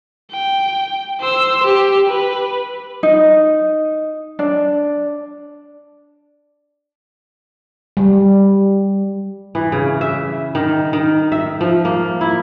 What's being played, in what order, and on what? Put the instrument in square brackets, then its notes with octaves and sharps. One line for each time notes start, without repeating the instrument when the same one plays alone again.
[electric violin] G5
C5 E6
G4
B4
[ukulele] D#4
D4
[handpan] G3
[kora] E3
C#3
E5
D#3
D#3
E5
F3
A#3
E4